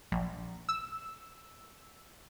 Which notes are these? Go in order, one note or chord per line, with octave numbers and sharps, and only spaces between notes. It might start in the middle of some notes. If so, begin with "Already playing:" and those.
A#1
E6